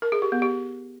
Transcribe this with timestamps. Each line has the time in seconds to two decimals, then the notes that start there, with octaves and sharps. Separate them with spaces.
0.02 A#4
0.12 G#4
0.22 G4
0.32 B3
0.42 G4